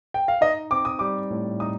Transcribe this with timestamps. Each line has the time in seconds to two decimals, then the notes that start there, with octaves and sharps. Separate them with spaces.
0.14 G5
0.28 F5
0.41 D#4 D#5
0.71 C4 D6
0.85 D#6
0.99 G3 D6
1.31 A2
1.60 D#4 D#6